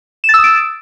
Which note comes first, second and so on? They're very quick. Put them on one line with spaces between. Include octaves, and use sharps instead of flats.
E7 A6 E6 D#6 D7